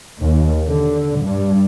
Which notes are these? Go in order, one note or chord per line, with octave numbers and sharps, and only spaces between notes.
D#2
D3
G2